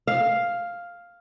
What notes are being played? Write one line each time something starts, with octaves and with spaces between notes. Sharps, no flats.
F5